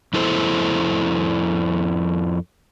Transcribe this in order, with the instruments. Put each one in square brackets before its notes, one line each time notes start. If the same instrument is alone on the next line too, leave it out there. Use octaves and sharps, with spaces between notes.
[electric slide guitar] F2 E4 A4 C5